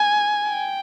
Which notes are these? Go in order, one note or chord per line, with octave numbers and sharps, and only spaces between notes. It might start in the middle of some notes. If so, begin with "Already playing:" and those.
Already playing: G#5
G5